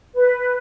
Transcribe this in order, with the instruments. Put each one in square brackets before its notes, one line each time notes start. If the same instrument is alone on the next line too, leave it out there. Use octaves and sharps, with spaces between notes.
[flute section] B4